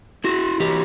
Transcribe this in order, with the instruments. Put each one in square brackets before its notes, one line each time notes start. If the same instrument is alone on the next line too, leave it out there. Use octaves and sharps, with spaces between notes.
[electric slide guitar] E4 F#4
E3 G4